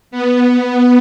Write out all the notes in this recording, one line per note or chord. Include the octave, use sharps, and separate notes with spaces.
B3